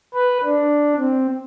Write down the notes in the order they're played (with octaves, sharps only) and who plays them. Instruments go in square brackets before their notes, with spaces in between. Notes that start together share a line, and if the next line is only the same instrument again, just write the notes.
[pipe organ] B4
D4
C4